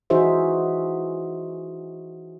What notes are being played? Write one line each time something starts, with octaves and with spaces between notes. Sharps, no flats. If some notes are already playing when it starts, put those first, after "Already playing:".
E3 D#4 F#4 G#4 C5 E5